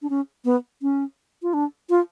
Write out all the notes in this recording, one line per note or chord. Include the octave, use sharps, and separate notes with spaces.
D4
C#4
B3
C#4
F4
D4
F4